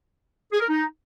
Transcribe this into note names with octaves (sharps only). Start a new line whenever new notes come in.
G#4
A#4
D#4